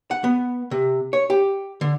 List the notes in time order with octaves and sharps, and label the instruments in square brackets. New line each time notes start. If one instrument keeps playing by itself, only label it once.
[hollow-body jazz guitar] F#5
B3
C3
C#5
G4
D3